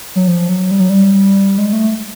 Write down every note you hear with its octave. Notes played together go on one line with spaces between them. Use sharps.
F#3
F3
F#3
G3
F#3
G3
G#3
A3